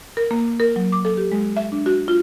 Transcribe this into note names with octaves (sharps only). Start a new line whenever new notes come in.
A#4
A#3
A#4
F#3
D6
A4
G4
G#3
E5
D4
F#4
F4